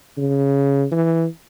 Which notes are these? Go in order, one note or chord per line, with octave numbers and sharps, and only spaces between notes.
C#3
E3